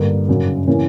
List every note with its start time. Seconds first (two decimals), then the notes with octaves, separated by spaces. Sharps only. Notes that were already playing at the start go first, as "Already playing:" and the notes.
Already playing: G2 D3 G3 A#3
0.28 F#2 C#3 F#3
0.68 C#3 E3 A#3 C#4